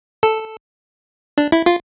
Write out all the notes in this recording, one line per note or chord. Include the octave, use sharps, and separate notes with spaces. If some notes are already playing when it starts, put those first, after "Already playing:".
A4
D4
E4
F4